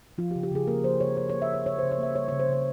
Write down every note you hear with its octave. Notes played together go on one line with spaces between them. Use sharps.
F3 F4
G4
C#3
G4
C#3 G#4
A#3 A#4
F3 C5
C#3 C#5
C#3 C#5
C#5
A#3
E5
F3 C#5
C#3 C#5
C5
C#3
C#5
A#3 E5
G3 C#5
C#5
C#3
C5
C#3 C#5